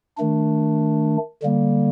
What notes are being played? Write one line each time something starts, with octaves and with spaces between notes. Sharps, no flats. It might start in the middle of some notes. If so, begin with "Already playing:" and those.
D#3 A3 D4
D3 G3 A#3